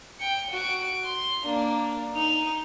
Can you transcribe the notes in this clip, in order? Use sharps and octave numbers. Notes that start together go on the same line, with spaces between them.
G5 C#7
F#4 D7
C6
A#3 D4
D#4 F7